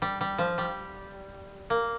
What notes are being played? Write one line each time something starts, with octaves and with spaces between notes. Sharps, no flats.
G3
G3
F3
G3
A#3